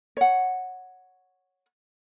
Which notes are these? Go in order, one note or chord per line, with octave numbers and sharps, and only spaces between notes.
C#5 F#5